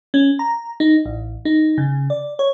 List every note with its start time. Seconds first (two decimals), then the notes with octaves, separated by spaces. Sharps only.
0.14 C#4
0.39 A#5
0.80 D#4
1.06 A1
1.45 D#4
1.78 C#3
2.10 D5
2.39 C#5